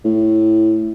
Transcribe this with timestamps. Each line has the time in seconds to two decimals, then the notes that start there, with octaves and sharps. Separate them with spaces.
0.04 A2